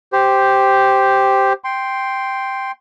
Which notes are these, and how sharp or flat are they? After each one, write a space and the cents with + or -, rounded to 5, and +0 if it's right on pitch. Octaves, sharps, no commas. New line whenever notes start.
G4 +0 C5 +0
G5 +0 C6 +0